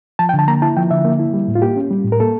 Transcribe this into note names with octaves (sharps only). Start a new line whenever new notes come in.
F3 A5
G5
D3
A5
A#3 A#5
E4 A5
F3 G5
D3 E5
A#3
E4
G3
A2
F4
A#3 G4
C#4
G3
A2
A#4
A#3 A4